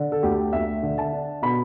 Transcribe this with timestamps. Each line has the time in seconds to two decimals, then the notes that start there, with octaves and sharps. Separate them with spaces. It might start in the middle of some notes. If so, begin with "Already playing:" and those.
Already playing: D3
0.12 A4
0.23 D2 G4
0.53 D2 E5
0.83 D3
0.98 A5
1.13 D4
1.42 B2 B5